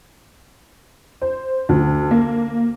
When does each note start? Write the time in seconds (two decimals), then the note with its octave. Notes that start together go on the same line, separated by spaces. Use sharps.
1.22 C5
1.69 D2
2.11 A#3